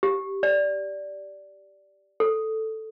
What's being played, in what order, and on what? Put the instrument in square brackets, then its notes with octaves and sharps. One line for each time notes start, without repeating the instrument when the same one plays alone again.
[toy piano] G4
D5
A4